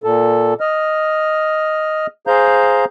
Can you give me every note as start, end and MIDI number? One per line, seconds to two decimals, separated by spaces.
0.04 0.54 46
0.04 0.54 69
0.60 2.07 75
0.60 2.07 89
2.27 2.85 68
2.27 2.85 72
2.27 2.85 77
2.27 2.85 82
2.27 2.85 91